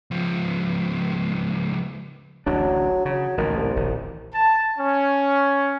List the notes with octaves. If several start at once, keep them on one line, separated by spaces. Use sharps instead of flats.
C#2 F3
D1 A1 F#3 D4
C#3 F#3
A1 D2 A#2 D#3
C2
E1 A#1 D#3
A5
C#4